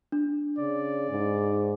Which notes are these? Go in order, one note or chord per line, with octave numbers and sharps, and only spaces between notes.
D4
C#3 D5
G#2